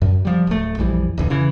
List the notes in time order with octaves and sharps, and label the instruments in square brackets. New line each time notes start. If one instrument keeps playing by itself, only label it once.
[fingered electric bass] F#2
F3 G3
D1 A3
A#1 F2 E3 G3
D1 E2 D3
C#3 E3